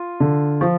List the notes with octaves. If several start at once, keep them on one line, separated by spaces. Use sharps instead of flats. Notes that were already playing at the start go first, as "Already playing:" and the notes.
Already playing: F4
D3
F3